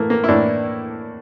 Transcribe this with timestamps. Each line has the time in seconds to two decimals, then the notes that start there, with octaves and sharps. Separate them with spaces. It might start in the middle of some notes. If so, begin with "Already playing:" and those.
Already playing: A2 E3 A3 A#3
0.10 A#3
0.24 E4
0.29 A2 E3 D4